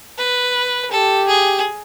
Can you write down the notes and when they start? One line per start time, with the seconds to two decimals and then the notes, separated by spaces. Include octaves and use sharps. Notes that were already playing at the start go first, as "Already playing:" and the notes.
0.18 B4
0.91 G4 A4
1.28 G#4